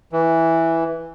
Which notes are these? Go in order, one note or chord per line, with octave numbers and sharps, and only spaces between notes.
E3